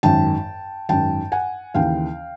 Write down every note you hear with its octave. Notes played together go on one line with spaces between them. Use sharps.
G#1 F#2 D#3 G5 A5
G#1 F#2 D#3 G5 A5
F#5 G#5
D#2 C#3 E3 F5 G5